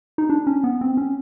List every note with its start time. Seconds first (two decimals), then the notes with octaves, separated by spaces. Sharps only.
0.18 D#4
0.30 D4
0.47 C#4
0.64 B3
0.81 C4
0.97 C#4